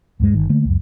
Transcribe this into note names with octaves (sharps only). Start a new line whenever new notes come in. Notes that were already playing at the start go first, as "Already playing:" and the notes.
D2 G2 G#3
G1 D#3
D3 A3 A#3
C#2 F#2